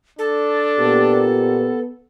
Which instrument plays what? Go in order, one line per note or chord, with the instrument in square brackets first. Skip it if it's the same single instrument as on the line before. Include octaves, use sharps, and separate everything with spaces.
[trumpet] D4 [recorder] A4
[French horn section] A#2 G4 [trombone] B3